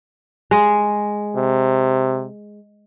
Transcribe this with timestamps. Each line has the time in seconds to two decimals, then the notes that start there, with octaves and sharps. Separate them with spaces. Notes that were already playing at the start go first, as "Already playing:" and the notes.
0.51 G#3
1.36 C3